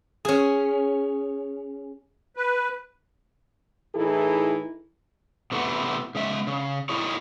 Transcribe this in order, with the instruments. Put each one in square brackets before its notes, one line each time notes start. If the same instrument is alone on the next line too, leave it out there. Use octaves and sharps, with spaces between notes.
[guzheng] C#4 G#4
[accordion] B4
[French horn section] A2 E3 D#4 E4 G#4 A4
[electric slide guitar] C3 E3 A3 B3
C#3 G#3 E5
C#3
D#4 E4 G#4 C#5